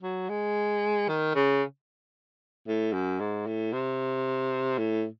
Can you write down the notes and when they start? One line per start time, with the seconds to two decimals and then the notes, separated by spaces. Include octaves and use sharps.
0.02 F#3
0.29 G#3
1.08 D#3
1.35 C#3
2.68 A2
2.93 F#2
3.20 G#2
3.47 A2
3.73 C3
4.78 A2